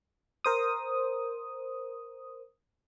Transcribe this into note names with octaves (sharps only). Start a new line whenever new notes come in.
A#4 C5 D#6